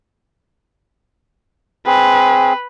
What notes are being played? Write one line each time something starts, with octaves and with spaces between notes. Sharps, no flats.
C4 G#4 B4